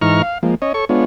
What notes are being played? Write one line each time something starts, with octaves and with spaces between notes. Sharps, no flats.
G#2 E3 D#4 A#5 C#6 F6
F5
F3 G#3 A#3
C#4 C#5 D#5
A4 C#5 C#6
G#3 B3 D4 F4 C#5